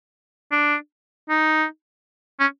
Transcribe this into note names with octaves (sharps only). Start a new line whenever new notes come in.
D4
D#4
C#4